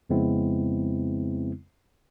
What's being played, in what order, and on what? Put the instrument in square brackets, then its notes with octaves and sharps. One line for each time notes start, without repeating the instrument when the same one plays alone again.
[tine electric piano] F2 C#3 G#3 B3 C4 E4